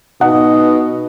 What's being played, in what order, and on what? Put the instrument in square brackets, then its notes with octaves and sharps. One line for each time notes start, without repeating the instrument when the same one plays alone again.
[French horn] B2 [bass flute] D#4 [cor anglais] D#5 [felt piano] F#5